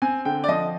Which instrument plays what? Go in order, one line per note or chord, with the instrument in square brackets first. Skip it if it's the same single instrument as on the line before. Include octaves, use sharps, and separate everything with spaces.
[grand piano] C4 G#5
D3 G5
D5
F3 D#5